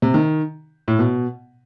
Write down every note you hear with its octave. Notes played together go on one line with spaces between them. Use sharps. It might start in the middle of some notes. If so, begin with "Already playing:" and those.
C3
D#3
A2
B2